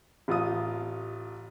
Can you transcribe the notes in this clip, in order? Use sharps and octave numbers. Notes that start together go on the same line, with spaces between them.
A1 F4 D#6